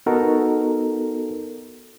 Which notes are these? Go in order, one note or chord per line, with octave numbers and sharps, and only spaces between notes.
B3 D#4 F#4 A4 A#4